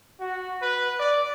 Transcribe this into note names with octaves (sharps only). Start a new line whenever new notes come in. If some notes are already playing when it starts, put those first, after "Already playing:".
F#4
B4
D5